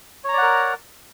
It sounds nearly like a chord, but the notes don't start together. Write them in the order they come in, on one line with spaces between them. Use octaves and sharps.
C#5 A#5 D5 F#5 A#4